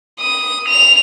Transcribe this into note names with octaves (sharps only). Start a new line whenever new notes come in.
D#6
F7